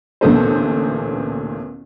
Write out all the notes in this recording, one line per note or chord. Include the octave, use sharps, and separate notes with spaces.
A1 D2 A#2 B3 A4 C5